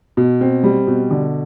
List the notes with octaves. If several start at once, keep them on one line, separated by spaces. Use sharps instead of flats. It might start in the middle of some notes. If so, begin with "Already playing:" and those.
B2
C4
G3
B2
D3